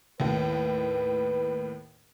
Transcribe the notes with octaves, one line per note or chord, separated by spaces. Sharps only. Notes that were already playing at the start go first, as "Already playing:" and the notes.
D#2 A2 B4